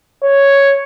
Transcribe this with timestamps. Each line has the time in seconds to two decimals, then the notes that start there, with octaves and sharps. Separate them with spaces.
0.24 C#5